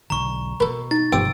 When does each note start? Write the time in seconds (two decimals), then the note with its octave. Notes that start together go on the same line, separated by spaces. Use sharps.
0.10 B1 D3 A#5 C#6
0.60 B2 A4 A#4 B5
0.91 D#4 A6
1.12 G1 F2 C3 F3 G3 G5 E6 D7